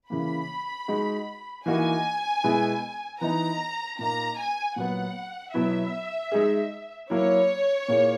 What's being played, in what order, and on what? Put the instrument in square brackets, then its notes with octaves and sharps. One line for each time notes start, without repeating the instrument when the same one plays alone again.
[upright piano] C#3 E3 A#3 [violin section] B5
[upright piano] G#3 D#4 F#4
[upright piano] E3 A#3 D#4 F#4 [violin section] G#5
[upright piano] B2 G#3 B3 E4
[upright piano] E3 B3 D#4 [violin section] A#5
[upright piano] A#2 A#3 D#4 [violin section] A#5
[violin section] G#5
[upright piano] A#2 F#3 B3 [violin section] F#5
[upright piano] B2 F#3 B3 E4 [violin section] E5
[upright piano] G#3 D#4 G#4
[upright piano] F#3 A#3 E4 [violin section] C#5
[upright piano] A#2 A#3 E4 G#4